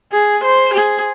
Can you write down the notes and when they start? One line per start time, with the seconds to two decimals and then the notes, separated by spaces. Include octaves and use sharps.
0.12 G#4
0.43 C5
0.74 G#4